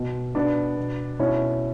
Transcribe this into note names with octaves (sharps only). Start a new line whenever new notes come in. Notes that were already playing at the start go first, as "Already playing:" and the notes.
Already playing: B2
B2 B3 D4
B2
B2 C#4 E4